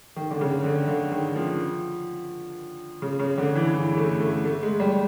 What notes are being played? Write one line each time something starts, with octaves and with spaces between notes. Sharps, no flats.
D#3
D3
C#3
D3
D3
D#3
F3
C#3
C#3
D3
E3
E3
A3
A3
A3
G#3
G3